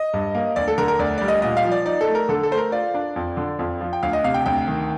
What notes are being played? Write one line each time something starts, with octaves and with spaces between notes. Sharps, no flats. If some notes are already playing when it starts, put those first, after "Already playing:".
Already playing: D#5
G2
A#3
D2 D5
A4
D3 A#4
A#4
D2 D5
G3 D5
D#5
A#2 D#5
F5
F3
D5
D#4 D5
A4
A3
A#4
D3 A4
A4
A3 C5
A#4
F4 D5
D4
F2
D3
F2
F3
G5
D2 F5
D#5
C3 F5
G5
D2 G5
D#3